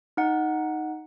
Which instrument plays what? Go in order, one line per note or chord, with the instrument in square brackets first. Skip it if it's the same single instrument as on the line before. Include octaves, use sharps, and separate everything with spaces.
[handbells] D#4 F#5